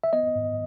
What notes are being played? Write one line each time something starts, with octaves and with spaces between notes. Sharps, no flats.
E5
B3 D#5
G#2